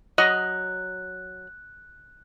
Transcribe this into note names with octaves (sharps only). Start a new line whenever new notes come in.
F#3 D#5 F#6